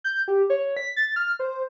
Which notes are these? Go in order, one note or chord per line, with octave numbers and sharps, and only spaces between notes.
G6
G4
C#5
B6
A6
F6
C5